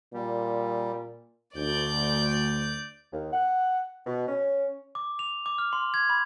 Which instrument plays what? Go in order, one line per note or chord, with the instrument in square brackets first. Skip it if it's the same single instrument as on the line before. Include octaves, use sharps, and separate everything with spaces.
[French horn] A#2 [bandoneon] G3
[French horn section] D2 [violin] D5 G6
[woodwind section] D#2
F#5
B2
C#4
[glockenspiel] D6
F7
D6
F6
C6
G#6
B5